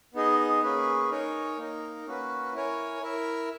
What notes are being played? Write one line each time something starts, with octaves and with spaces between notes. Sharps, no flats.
B3 D#4 G#4 D#5
A#3 C#4 G#4 B4
D#4 A#4 C#5 G#5
A#3 D#4 A#4
A#3 C#4 F#4 B4
E4 A#4 C#5 G#5
E4 A#4 E5